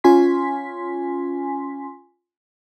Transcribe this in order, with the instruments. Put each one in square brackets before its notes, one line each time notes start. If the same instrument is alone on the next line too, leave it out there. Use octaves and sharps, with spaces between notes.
[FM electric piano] C#4 F4 G#5 C6 B6